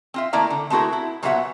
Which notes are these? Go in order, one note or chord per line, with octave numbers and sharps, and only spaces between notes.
C4 F4 E5
D#3 A3 A#3 E4 D5 A#5
D3
A3 C4 E4 F#4 G#4 A#4
E4
A#2 F#3 B3 F#4 E5 F#5